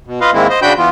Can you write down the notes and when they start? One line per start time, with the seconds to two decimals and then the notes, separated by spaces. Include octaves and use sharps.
0.07 B2
0.21 F4 B4 D#5 F5
0.33 G#2 D#3 G#3 A#3 C4 E4
0.50 C5 D#5
0.62 C#3 D4 F#4 G5 B5 G6
0.77 E3 B3 F4